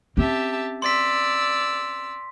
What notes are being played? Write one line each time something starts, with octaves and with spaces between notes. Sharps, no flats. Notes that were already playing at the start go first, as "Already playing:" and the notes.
C4 C#4 G4 E5 A5
D5 C6 E6 B6